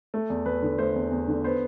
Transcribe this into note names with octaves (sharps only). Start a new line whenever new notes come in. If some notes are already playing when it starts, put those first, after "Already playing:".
A3
E2
E2 B4
D3
A3 C5
E2
E2
D3
B3 C5